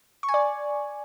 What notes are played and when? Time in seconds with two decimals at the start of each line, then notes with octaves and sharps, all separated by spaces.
0.23 C#6
0.29 G#5
0.34 D5